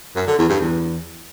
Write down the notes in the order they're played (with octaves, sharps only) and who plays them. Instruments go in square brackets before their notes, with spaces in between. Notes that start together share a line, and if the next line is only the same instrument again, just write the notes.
[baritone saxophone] F#2
D3
E2
G2
E2